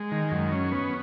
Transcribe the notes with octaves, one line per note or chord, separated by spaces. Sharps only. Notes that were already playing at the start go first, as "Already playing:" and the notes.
Already playing: G#3
D#3
F#2
C#4
B3